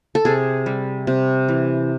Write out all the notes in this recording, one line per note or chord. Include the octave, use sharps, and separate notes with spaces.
A4
C3 G#4
G3
C3
E3